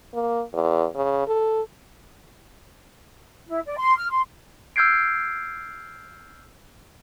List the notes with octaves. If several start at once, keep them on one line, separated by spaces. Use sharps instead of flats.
A#3
E2
C#3
A4
E4
D5
C6
F6
C6
E6 F6 G6 G#6 C7 D7